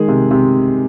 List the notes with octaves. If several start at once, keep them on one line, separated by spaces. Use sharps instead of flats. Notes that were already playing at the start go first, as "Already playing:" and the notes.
Already playing: D#3 G#3 G#4
C3
C3